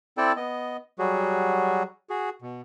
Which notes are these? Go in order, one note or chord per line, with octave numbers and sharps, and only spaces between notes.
C4 E4 A4 D5 G5 A5
B3 D#5
F#3 G3 F#4 G#4
F#4 G#4
B2